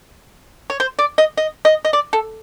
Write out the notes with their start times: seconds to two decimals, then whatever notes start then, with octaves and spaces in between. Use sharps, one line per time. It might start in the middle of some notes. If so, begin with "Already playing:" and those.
0.70 C#5
0.80 C5
0.99 D5
1.18 D#5
1.37 D#5
1.65 D#5
1.85 D#5
1.93 D5
2.13 A4